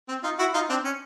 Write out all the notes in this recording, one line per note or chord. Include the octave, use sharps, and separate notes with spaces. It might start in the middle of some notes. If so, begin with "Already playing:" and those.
C4
D#4 F4
E4 F#4
D#4 F4
C4 D4
C#4